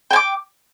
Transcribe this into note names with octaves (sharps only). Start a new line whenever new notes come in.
G5 G#5 D6